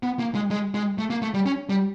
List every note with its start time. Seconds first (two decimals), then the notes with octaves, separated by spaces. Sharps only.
0.03 B3
0.19 A#3
0.35 G#3
0.51 G#3
0.74 G#3
0.98 A3
1.10 A#3
1.22 A3
1.34 G3
1.46 C#4
1.70 G3